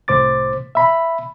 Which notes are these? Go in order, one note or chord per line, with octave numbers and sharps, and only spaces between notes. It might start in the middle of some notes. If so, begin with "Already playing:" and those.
C2 A2 C5 D6 A6
E5 B5